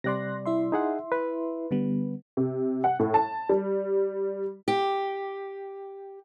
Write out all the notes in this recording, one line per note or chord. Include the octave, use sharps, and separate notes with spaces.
C3 G3 D5 C6 F#6 A#6
E4 E5 C6
D#4 G#4 F#5
B4
D3 G3 B3
C3
F#5
A2
A5
G3
G4